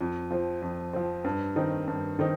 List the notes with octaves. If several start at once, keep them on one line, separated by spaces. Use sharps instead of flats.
F2
F3 C4
F2
F3 C4
G2
D#3 C4 D#4
G2
D#3 C4 D#4